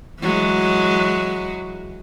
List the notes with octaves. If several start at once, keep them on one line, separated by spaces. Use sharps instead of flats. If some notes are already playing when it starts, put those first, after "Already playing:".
E3 F#3 G#3